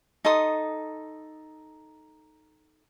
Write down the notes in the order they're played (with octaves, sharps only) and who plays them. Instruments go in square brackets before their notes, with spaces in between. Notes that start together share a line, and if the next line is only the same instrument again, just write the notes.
[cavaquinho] D#4 A4 C6 D#6